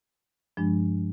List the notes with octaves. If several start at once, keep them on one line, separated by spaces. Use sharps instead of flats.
G2 F3 G#3 D4